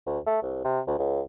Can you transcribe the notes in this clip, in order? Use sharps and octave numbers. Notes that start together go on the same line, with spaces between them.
D2
A3
C2
C3
D2
C#2